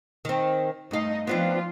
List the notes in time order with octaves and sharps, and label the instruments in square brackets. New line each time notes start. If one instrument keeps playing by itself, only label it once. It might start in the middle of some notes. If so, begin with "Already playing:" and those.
[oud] D#3 C4
[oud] G2 F5 [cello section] A3 D#4 D#5
[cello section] F3 F4 [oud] B3 C4 D4